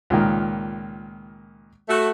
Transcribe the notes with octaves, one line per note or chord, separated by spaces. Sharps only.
C#2 A#2 D#3
A3 F#4